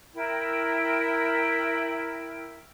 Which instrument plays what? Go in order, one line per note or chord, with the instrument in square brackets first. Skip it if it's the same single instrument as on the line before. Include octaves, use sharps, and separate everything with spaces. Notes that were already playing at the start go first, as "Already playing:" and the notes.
[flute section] E4 A#4 G5